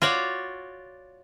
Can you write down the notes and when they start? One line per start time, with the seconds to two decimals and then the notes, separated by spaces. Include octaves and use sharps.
0.02 F4 F#4 C#5 D5